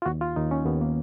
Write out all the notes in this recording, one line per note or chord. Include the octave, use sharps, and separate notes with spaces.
F4
D#2 F#4
F4
D#2 D#4
C#4
D#2 B3
A#3